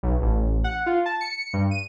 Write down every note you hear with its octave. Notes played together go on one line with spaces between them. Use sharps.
B1
A1
F#5
F4
A5
C#7
G2
D#7